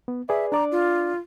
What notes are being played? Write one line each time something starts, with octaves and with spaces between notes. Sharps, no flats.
B3
G#4 B4 D5 E5
D4 D5 A#5 D6
F4